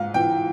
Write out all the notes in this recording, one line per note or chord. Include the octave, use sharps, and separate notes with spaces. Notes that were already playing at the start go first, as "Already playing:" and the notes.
Already playing: G#2 F5
E3 G5